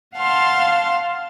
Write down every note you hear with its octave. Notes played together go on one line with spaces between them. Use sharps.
F5 F#5 A5 C6 F6